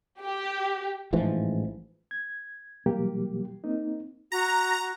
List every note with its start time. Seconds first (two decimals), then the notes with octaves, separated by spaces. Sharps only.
0.22 G4
1.13 A1 G#2 E3 F3
2.11 G#6
2.86 B2 E3 F#3 G3 A#3 G4
3.64 A#3 C4 D#4
4.32 F#4 A#5